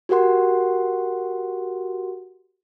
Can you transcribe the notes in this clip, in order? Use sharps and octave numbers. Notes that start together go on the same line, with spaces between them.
F#4 G4 A#4 F#5 C6